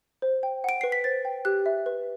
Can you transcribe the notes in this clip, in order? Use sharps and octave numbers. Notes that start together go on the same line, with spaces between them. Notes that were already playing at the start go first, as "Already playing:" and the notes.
C5
G5
F#5 D7
B4 C7
B6
C5 A6
G5
G4 F#6
E5
B4